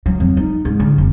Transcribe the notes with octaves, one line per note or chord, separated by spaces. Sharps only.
F#3
F2
D#4
G#2
D3
F1